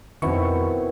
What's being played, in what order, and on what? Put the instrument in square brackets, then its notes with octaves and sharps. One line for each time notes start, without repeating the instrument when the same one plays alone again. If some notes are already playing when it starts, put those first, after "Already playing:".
[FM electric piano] F2 C#6 [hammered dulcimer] B2 E4 [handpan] D#3 C4